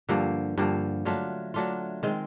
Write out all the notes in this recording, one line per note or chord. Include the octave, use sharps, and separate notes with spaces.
G2 D3 F3 A#3
G2 D3 F3 A#3
F#3 A3 D4 F4
F#3 A3 D4 F4
D#3 G#3 C4